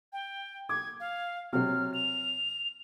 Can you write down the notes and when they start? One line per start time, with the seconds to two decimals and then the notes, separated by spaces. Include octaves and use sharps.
0.13 G5
0.69 D6 G#6
1.00 F5
1.53 C3 F#3 F6
1.94 F7